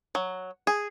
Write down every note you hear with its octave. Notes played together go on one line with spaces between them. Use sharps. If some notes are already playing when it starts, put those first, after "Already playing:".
F#3
G#4